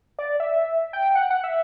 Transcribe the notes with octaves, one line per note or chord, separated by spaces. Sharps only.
D5
E5
G5
F#5
F#5
E5